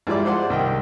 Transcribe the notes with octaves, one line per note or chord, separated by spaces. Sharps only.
G#2 F3 G3 E4 D5 D6
G#4 C5 D5 F#5 C6
C2 D#3 G5